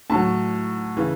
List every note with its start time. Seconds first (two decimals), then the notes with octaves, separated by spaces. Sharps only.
0.10 A2 F#3 A5
0.97 C#3 E3